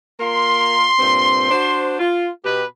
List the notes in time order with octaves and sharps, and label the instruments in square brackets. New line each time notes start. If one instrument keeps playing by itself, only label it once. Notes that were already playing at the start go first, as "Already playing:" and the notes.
[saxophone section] A#3 F4 A#4 [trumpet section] C6
[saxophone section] G2 A#2 C4
D4 F#4 C5
F4
[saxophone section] B2 G4 [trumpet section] B4